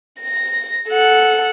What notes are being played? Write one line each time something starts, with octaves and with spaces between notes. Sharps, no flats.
A#6
A4 F#5